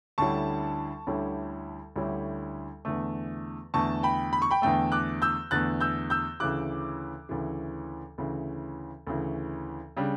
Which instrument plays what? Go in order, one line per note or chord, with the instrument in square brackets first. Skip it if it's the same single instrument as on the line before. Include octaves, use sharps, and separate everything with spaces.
[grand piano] D2 D3 G3 C#4 E4 A5 C#6
D2 D3 G3 C#4 E4
D2 D3 G3 C#4 E4
E2 D3 A3
E2 D3 A3 A5 C#6
G5 B5
B5
C#6
G5 B5
E2 D3 A3 G5
D6 F#6
E6 G6
E2 D3 A3 F#6 A6
E6 G6
E6 G6
D2 C#3 E3 D6 F#6
D2 C#3 E3
D2 C#3 E3
D2 C#3 E3
C#3 G3 D4